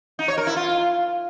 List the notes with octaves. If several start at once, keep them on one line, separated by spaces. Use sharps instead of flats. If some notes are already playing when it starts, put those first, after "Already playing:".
D#4
C#5
A#4
E4
F4